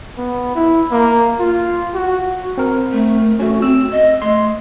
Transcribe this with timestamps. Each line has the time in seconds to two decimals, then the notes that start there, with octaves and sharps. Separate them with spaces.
0.17 B3
0.55 E4
0.91 A#3
1.39 F4
1.94 F#4
2.58 C4 A#4
2.92 A3
3.39 A3 C#4 F#4
3.62 C4 E6
3.91 D#5
4.22 A3 D#5 C6